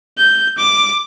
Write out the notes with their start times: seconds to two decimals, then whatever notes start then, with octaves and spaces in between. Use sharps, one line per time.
0.18 G6
0.58 D6